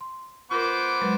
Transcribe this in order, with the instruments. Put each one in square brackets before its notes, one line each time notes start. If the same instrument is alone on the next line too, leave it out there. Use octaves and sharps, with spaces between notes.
[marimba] C6
[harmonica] B3 C5 D6 [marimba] F4 A#4
[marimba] F#3 G#3 B4